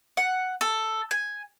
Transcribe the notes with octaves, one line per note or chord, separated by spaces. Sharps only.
F#5
A4
G#5